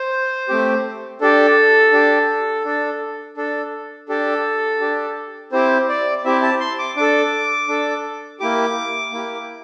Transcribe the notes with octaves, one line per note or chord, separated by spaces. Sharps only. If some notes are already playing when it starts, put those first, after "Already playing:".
Already playing: C5
A3 C4 G4
D4 G4 A4
D4 G4
D4 A4
D4 A4
D4 G4 A4
D4 G4
C4 E4 G4 C5
D5
C4 E4 G4 E5
A5
C6
D6
D4 A4 D6
D4 A4
A#3 E4 G4 D6
A#3 E4 G4